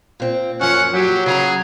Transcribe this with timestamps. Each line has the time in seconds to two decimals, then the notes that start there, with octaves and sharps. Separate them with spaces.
0.20 A#2 C4
0.61 F#2 A#2 F3 C#4 F#5
0.94 F#3 G4
1.26 C#3 G#4 A#5